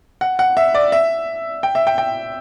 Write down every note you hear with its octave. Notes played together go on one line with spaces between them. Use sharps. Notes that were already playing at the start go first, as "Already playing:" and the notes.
F#5
F#5
E5
D5
E5
G5
E5
G5
G5